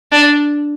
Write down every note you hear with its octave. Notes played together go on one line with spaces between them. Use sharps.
D4